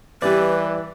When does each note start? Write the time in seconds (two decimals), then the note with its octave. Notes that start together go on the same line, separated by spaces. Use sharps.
0.22 E3 G3 G4 B4 D5